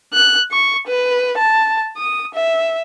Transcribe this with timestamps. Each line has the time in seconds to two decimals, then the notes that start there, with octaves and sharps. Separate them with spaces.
0.13 F#6
0.51 C#6
0.87 B4
1.38 A5
1.97 D#6
2.34 E5